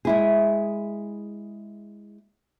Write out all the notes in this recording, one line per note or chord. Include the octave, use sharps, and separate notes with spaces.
G#3 E4 G#4